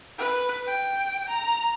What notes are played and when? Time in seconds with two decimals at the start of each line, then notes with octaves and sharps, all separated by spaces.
0.18 B4
0.67 G5
1.29 A#5